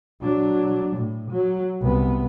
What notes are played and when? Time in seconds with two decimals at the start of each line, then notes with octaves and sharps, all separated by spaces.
0.22 F#3 D4
0.97 A2
1.31 F#3
1.82 C2 B3